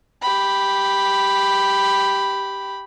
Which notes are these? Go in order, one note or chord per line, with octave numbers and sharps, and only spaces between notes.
G4 B5